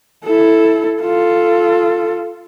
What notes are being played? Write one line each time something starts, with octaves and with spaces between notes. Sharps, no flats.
E4 A4
F4 A4